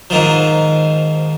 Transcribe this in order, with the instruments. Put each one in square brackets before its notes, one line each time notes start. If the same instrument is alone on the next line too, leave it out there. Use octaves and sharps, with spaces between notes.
[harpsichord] G#2 D#3 F3